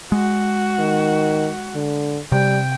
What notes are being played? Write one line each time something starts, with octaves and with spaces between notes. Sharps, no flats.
G#3 F#4
D#3
D3
C3 G3 G5